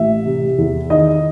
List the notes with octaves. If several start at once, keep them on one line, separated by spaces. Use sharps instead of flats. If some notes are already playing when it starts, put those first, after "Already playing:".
Already playing: A1 E5
C3
E2
D#3 D#5